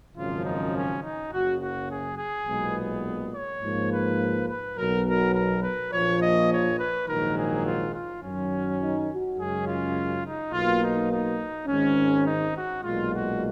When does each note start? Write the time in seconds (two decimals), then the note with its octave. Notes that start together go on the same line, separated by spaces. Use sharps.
0.16 G#1 F#2 C#3 F3 F4
0.45 D#4
0.75 C#4
1.02 D#4
1.31 F#1 F#2 C#3 F#4
1.61 F#4
1.90 G#4
2.18 G#4
2.47 B1 A#2 G#3 B3
3.33 C#5
3.62 G#2 F3 A#3
3.90 B4
4.48 B4
4.77 B1 B2 F#3 A#4
5.06 A#4
5.35 A#4
5.63 B4
5.92 A#1 A#2 F3 C#5
6.21 D#5
6.50 C#5
6.79 B4
7.07 A#1 G#2 D#3 F#3 A#4
7.36 G#4
7.65 F4
7.94 F4
8.22 F#2 D#3 F#3 C#4
8.80 D#4
9.09 F#4
9.37 F#2 C#3 G#3 C#4 G#4
9.67 F4
10.24 D#4
10.53 B1 B2 A#3 F4
10.82 D#4
11.10 D#4
11.68 G#1 G#2 D#3 C#4
12.25 D#4
12.55 F#4
12.83 B1 A#2 G#3 F4
13.13 F#4